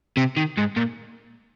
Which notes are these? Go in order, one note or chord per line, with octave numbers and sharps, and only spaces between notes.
C3
D#3
G#2
A#2